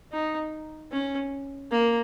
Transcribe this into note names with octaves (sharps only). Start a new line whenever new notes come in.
D#4
C#4
A#3